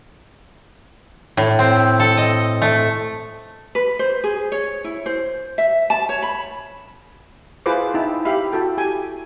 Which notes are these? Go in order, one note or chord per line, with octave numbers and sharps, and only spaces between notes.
A2
C4
A4
D#5
A3
B4
C5
G#4
C#5
E4
C5
E5
A5
C#5
B5
E4 F4 G#4 B4 C5 D6
D#4 E4 G5
G4 E5 F5 B5
E4 F#4 A4 G5
G4 G#5